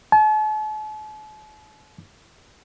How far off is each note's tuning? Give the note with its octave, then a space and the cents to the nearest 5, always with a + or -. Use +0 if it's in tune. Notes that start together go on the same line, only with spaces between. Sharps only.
A5 -45